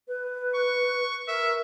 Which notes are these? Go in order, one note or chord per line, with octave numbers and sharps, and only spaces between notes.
B4
C#6
A#4 E5